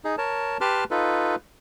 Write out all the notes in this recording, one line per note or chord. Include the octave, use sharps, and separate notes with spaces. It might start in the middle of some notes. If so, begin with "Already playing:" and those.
D#4 G#4
A#4 C#5 A5
G4 B4 A5 C6 D6 F6
D#4 F4 A4 B4